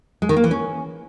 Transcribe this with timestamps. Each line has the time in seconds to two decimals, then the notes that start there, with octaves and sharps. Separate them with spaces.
0.22 G#3
0.29 D#3
0.36 A#3
0.44 E3
0.51 C#4